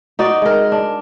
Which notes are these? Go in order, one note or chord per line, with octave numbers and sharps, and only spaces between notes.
D#4 F#4 D5
G#3 A#4
D4